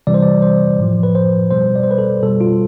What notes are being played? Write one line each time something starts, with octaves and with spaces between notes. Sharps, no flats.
C3 E3 G3 D5
C5
D5
C5
A2 F3
B4
C5
B2 G3 C5
D5
C5
B4
A4
B2 G3 A4
F4